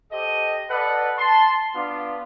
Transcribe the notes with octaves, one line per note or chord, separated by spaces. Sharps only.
G4 A4 C5 D#5
A4 B4 D5 D#5 F#5
A5 C6
B3 D4 F4